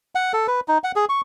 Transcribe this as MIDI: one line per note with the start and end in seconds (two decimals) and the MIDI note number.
0.15 0.32 78
0.33 0.47 69
0.48 0.60 71
0.68 0.78 63
0.84 0.92 78
0.96 1.05 68
1.09 1.21 85